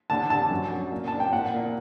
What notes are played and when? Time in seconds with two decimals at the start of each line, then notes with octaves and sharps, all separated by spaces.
0.10 D3 A5
0.30 D3 A5
0.51 F#2
0.71 F#2
0.92 A#2
1.08 D4 A5
1.20 G5
1.32 A#2 F#5
1.54 A#2